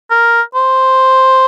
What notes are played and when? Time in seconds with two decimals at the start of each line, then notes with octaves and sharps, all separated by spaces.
0.11 A#4
0.55 C5